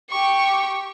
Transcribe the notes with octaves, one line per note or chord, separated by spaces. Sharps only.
G4 C#6